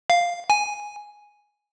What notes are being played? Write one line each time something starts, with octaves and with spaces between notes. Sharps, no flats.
F5
G#5